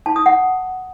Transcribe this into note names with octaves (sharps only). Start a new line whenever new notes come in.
A5
D#6
F#5